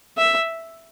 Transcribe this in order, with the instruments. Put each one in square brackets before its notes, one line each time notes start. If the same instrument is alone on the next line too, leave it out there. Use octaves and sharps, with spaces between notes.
[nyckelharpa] E5